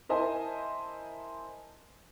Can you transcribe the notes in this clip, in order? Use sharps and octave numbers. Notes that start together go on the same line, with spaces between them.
E4 A#4 C5 D#5 G#5 A5